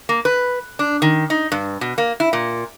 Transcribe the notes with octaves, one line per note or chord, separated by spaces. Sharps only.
A#3
B4
D4
D#3
D#4
G2
B2
A#3
E4
A#2